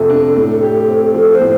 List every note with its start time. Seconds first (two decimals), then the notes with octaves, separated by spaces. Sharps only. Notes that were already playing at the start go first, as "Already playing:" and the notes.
Already playing: F2 C3 A3 A4
0.10 D4
0.36 A2
0.63 G4
0.88 C4
1.14 F3 A4
1.35 C5
1.40 A2